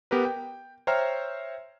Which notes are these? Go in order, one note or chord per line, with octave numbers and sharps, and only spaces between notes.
B3 G4 A#4 B4
G5
C5 C#5 E5 G5 A#5 F6